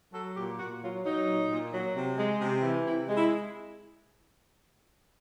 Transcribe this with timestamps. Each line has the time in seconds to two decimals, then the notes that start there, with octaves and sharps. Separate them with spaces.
0.13 F#3 A4
0.36 A#2 G4
0.59 A#2 F#4
0.81 F#3 F4
1.04 F#3 D#4
1.27 A#2
1.50 A#2
1.72 F#3
1.95 C3
2.18 G#3
2.41 C3
2.62 E3
2.85 C3 E4
3.08 G#3
3.16 E4